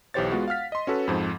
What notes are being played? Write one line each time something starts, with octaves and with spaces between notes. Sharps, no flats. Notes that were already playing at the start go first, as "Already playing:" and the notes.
B1 E3 G4 C5 C#5 A6
G#3 B3 F4 F#4
F5 F#5 F6 B6
D#5 C6
C#4 F#4 A4 B4
F2 G#2 F3